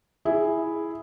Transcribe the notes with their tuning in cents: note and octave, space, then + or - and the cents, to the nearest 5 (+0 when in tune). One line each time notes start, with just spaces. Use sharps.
E4 +0 G#4 +0